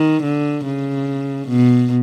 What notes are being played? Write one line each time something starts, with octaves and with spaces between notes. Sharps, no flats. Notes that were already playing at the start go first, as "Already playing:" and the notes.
Already playing: D#3
D3
C#3
B2